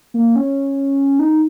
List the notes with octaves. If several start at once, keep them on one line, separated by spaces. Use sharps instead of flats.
A#3
C#4
D#4